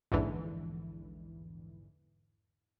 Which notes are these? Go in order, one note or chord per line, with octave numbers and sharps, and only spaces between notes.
A#1 E2 G#2 D3 E3